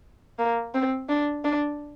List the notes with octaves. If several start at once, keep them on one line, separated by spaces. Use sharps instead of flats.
A#3
C4
D4
D4